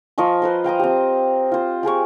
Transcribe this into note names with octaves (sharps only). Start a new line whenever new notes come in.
F3 A#4 D#5 C#6
B4 C5 C6
F5 G5 A#5 D#6
C4 G4
F4 C5
G4 G#4 A#4 C#6